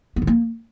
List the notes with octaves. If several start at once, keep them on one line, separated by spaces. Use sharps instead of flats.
B3
D#3
A#3